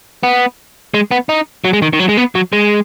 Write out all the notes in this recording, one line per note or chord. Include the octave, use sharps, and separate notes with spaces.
B3
G#3
B3
D#4
F#3
G#3
D#3
D#3
F#3
G#3
B3
F#3
G#3